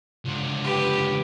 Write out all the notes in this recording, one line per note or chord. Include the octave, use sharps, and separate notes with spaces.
C#2 D3
G4 B4